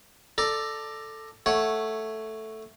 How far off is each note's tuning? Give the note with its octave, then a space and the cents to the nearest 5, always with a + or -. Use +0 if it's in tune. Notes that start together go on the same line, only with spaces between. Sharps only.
A4 +5 D5 +15 A#5 +0
A3 +0 C#5 +0 F#5 +0